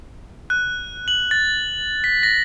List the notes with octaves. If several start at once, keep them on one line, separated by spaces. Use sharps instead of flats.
F#6
F#7
A6
B6
A#6